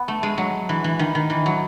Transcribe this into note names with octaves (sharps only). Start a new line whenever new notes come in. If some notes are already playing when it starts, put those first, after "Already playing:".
Already playing: B3
A3
G#3
F#3
E3
E3
D#3
D#3
E3
F#3